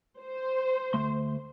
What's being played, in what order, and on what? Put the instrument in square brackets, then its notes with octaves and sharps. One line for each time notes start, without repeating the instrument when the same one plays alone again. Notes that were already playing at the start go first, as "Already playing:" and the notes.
[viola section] C5
[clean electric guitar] D2 A3 C6